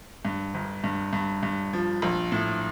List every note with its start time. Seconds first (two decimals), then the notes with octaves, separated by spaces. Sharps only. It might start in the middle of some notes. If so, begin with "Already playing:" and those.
0.25 G2
0.54 G1
0.84 G2
1.13 G2
1.43 G2
1.73 F3
2.02 A#1
2.32 A2